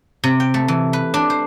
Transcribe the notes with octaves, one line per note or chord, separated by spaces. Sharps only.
C3
G5
A3
E3
B4
D4
C5